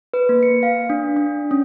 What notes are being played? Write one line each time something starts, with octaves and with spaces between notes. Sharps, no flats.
B4
A#3
C#7
F5
D4
D4
C#4